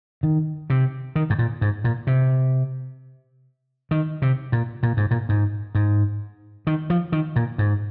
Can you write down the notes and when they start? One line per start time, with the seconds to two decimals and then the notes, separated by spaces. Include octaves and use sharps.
0.23 D#3
0.70 C3
1.15 D#3
1.30 G#2
1.39 A#2
1.61 G#2
1.84 A#2
2.07 C3
3.91 D#3
4.22 C3
4.52 A#2
4.83 A#2
4.97 G#2
5.11 A#2
5.29 G#2
5.75 G#2
6.67 D#3
6.90 F3
7.12 D#3
7.36 A#2
7.58 G#2